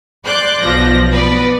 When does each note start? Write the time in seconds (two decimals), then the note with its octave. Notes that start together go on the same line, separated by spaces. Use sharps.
0.25 D5 C6 D6 F#6 G6
0.60 B1 F3 A#6
1.10 B3 B4 D5